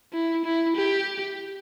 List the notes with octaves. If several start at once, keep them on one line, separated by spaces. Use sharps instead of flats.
E4
E4
G4